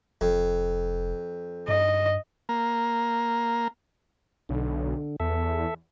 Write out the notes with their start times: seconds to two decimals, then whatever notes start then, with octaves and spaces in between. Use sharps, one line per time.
0.21 F1 F2
1.68 G2 D#5
2.49 A#3
4.49 B1 D3
5.20 E2 A4 E5